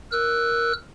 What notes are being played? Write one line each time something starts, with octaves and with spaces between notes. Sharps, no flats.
A#4 E6 F#6